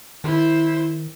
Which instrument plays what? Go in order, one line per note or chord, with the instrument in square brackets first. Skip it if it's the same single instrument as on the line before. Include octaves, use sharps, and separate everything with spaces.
[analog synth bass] D#3 [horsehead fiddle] E4 C5